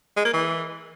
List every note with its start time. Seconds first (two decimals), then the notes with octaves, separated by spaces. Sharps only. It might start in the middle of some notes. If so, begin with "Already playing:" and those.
0.17 G#3
0.25 A#3
0.34 E3